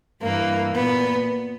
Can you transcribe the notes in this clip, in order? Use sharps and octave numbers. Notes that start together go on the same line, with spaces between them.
G2 E3 A#3
A#2 B3